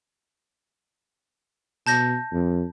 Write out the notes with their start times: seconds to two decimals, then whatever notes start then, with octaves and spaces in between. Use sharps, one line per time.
1.87 B2 A5 G6 A#6
2.33 F2